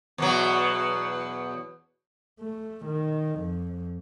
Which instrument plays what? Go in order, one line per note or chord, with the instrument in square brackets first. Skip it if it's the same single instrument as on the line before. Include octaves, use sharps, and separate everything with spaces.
[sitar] E2 B2 F#3
[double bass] A3
D#3
F2